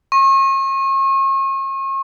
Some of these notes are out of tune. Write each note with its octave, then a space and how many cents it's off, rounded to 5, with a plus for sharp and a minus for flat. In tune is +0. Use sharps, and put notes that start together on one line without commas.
C#6 -40